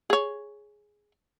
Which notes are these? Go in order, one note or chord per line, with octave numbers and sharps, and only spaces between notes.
G#4 C#5